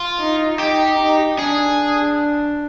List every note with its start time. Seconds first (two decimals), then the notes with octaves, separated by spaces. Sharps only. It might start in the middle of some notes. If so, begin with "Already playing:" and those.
Already playing: F4
0.19 D#4
0.59 D#4 G4
0.99 D#4
1.39 D4 G#4